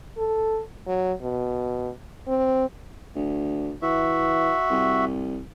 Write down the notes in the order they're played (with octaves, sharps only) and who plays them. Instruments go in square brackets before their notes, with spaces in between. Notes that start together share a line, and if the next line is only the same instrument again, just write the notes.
[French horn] A4
F#3
B2
C4
[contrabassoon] D2
[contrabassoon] E3 [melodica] F#4 E5
[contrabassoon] C2